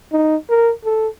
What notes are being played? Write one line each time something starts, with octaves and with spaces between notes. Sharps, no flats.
D#4
A#4
A4